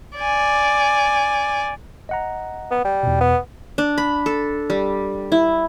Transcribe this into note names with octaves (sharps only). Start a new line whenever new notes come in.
D5 G#5
D#5 F#5 A#5
B3
G3
E2 B2
B3
D4
B5
A4
G3
E4